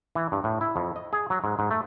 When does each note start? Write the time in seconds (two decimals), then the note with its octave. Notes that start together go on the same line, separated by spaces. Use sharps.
0.15 E3
0.32 G2
0.44 A2
0.61 E4
0.76 F2
0.96 D#5
1.13 G#4
1.30 F#3
1.44 G#2
1.59 G#2
1.71 A3